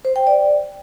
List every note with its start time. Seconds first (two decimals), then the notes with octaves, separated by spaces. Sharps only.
0.05 C5
0.16 G5
0.27 D5